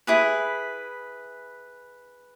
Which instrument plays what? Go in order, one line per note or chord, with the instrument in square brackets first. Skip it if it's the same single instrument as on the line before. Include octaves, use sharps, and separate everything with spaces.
[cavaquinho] E4 G#4 B4